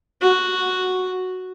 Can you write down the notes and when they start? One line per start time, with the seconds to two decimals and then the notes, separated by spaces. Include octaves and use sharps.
0.22 F#4